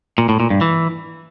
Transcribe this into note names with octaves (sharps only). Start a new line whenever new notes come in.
A#2
A2
A#2
G2
E3